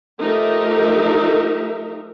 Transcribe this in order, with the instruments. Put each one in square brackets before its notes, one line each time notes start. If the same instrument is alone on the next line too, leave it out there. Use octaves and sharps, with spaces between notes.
[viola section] F3 A3 D#4 G4 A#4 E5